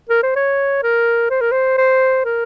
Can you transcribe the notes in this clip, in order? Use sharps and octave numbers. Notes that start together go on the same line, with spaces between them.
A#4
C5
C#5
A#4
C5
A#4
C5
C5
A#4